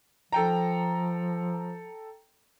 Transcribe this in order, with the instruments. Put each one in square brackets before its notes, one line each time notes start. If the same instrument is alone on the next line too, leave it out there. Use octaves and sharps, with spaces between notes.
[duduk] F3 [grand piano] A4 G5 A#5